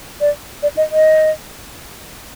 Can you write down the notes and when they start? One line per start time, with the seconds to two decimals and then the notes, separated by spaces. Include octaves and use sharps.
0.21 D5
0.63 D5
0.77 D#5
0.92 D#5